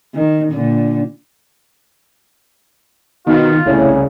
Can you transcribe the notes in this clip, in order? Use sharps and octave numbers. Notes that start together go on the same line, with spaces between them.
D#3
A#2 D3
B2 D#3 F4
C2 A2 C#3